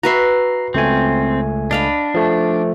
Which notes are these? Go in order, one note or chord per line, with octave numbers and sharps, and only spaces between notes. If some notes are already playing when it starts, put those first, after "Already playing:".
F#4 B4 E5 A#5 C7
C#2 A3 C4 G#5
D4 D#5 F5 B5
F3 A3